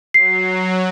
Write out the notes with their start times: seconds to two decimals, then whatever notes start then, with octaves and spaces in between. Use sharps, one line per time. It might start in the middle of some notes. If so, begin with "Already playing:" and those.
0.14 F#3 C7